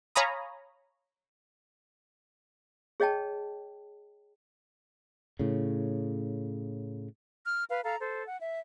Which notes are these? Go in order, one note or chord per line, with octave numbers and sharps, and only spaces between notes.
C#5 F5 G#5 A#5 B5 D#6
G#4 C#5 D#5 G5 A5
A2 C#3
F6
B4 F5
A4 F5 A#5
A4 C5
F#5
E5